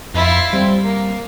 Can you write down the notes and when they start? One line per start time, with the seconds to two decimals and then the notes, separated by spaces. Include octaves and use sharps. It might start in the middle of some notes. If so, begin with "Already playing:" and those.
0.14 F2 E4 F4
0.53 G3 C4
0.82 A#3